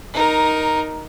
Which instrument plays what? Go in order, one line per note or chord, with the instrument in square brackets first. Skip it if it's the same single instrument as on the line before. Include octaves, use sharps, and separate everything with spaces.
[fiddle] D#4 A#4